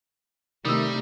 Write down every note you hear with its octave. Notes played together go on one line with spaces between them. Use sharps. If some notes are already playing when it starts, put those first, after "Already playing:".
C3 D#3 G3 A3 D#4 D#6 E6